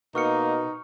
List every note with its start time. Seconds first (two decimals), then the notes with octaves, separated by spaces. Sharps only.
0.15 B2 A#3 D#4 C#6 F6 C#7